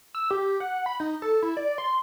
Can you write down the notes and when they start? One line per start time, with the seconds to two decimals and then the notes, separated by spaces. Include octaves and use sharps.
0.15 E6
0.31 G4
0.60 F#5
0.86 B5
1.00 D#4
1.22 A4
1.43 E4
1.57 D5
1.78 C6